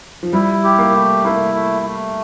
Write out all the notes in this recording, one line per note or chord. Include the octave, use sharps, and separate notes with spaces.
F3
G3 E4
G4
A#3
A3
A#3 E4
A3
A3